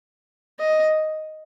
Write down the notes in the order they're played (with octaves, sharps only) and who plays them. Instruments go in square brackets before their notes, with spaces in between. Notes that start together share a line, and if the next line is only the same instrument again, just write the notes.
[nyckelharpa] D#5